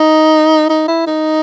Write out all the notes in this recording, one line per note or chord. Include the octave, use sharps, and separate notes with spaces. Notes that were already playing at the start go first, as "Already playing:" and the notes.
Already playing: D#4
D#4
E4
D#4